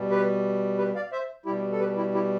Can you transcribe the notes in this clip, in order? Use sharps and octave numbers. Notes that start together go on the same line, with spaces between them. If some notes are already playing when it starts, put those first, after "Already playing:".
Already playing: B2 G3
G4 B4
G4 B4
D5 F5
C5 E5
B2 G3 E4 G4
A4
G4 B4
E4 G4
E4 G4